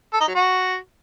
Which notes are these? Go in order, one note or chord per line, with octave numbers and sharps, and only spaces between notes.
A4
D#4
F#3
F#4